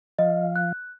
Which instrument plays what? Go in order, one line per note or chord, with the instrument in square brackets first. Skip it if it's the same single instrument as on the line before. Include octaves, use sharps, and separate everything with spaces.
[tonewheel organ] F3 F5 [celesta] D#5
[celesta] F#6